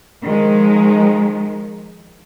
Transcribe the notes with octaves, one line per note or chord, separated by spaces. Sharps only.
D#3 F3 G#3